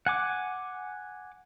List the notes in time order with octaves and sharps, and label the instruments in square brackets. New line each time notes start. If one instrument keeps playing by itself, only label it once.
[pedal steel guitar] F#5 G#5 D6